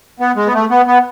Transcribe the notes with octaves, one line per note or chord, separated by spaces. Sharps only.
B3
G#3
B3
A3
B3
B3